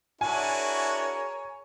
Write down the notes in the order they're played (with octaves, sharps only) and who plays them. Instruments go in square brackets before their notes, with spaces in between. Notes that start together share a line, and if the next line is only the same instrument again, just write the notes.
[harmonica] D4 E4 F#4 [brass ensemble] G#4 A#4 C#5 [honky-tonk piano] G#5